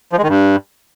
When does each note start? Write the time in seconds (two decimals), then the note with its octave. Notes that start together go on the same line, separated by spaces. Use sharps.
0.13 F3
0.18 G#3
0.23 D#3
0.29 G2